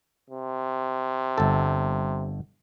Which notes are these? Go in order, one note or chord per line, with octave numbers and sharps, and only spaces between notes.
C3
G1 A4